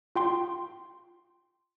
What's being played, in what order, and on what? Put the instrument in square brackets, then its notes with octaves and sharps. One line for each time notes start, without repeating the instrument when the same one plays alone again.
[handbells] F4 G5 C6